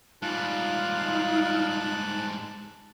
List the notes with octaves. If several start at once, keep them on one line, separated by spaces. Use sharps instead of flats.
G#2 G3 D#4 F4 A5 F#6